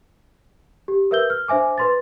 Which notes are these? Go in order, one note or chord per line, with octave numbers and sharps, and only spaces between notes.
G4
A#4 B4 E5 E6 G6 G7
F6
D4 C5 E5 G#5 D6
B4 C6 A6